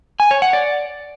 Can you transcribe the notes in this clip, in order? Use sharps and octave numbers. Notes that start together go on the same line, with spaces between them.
G#5
C#5
F#5
D5